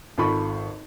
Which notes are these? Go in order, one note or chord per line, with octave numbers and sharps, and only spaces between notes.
G#1 F4 A4 A5 B5 C#6